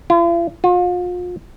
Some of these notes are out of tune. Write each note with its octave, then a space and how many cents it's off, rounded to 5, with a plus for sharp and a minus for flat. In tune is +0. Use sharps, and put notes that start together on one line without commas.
F4 -45
F4 +40